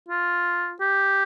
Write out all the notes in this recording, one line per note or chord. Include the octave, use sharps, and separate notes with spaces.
F4
G4